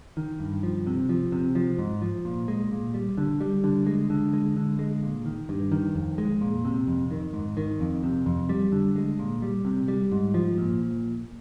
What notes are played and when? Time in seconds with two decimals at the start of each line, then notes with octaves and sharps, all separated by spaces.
0.17 D#3
0.40 G2
0.63 F3
0.87 C3
1.09 F3
1.32 C3
1.55 F3
1.79 G#2
2.02 F3
2.25 A#2
2.48 G#3
2.71 A#2
2.94 G3
3.18 D3
3.41 G3
3.64 D3
3.87 G#3
4.10 D3
4.33 G#3
4.56 D3
4.79 G#3
5.02 A#2
5.26 D#3
5.49 G2
5.72 D#3
5.95 F2
6.18 G#3
6.41 A#2
6.65 C3
6.87 F2
7.11 D#3
7.33 G#2
7.57 D#3
7.80 F2
8.03 C3
8.26 F2
8.49 G3
8.72 D3
8.96 G#3
9.19 A#2
9.42 G3
9.65 C3
9.88 G3
10.12 G#2
10.34 F3
10.58 A#2